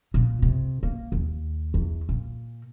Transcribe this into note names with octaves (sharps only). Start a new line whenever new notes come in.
A#2
C3
A#3
D#2
E2
A#2